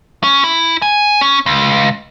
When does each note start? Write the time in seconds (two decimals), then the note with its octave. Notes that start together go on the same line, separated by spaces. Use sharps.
0.23 C#4
0.44 E4
0.82 G#5
1.21 C#4
1.46 C#2